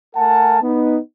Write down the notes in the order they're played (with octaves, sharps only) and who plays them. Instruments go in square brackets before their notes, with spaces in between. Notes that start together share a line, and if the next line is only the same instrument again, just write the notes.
[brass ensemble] A3 A#4 F#5 G#5 A5
B3 D#4